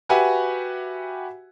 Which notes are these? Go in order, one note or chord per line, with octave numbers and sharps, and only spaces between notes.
F#4 G4 B4 E5 F#5 G#5